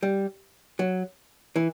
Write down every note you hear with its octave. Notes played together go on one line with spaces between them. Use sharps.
G3
F#3
E3